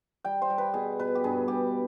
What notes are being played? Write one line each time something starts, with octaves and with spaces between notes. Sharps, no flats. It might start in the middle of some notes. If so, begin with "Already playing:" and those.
G3 G5
C5
G3
B4
B2 G#4
B2 B4
G4
G2 G#4
G2 G4